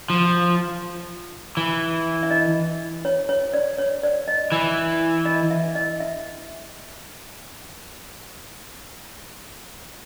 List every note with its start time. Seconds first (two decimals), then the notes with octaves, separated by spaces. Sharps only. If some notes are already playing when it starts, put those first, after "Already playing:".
0.10 F3
1.57 E3
2.23 E5
2.31 D#5
3.05 C#5
3.29 C#5
3.53 D5
3.78 C#5
4.03 D5
4.28 D#5
4.52 E3
5.25 D#5
5.51 E5
5.75 D#5
6.00 E5